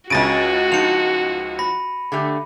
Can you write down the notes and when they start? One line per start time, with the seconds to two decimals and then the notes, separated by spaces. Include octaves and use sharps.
0.10 C#2 C#3 C#4 F#4 A6 A#6 D7 D#7
0.72 F3 D#4 C#7 F7
1.59 B5 A#6
2.12 D3 A3 G4